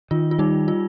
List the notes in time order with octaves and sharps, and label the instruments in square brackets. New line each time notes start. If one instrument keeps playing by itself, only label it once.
[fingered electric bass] D#3 [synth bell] F4
[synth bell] F4
[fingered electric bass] G3 [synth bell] D#4
[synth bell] F4